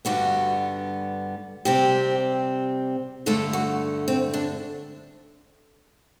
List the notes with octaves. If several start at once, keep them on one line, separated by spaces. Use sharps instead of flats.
G2 D3 G3 B3 F#4
C3 G3 C4 G4
G2 D3 A3 A4
F#4
C4
D4